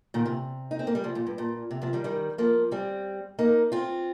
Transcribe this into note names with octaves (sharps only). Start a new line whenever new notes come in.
A#2 D#3
C3
D#4
C4
A#3
G3
C3 F3
A#2
G2
A#2
C3
C3 F3
D#3 G3
D#3 G3
F3 A#3
G3 C4
A#3 D#4
C4 F4